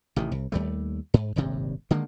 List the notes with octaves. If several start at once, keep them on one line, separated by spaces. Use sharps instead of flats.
A1 C3 D#3
C2
D#2 G3 A3
G#2
D#1 G#1 G2 C3
D3 D#3 G#3 A#3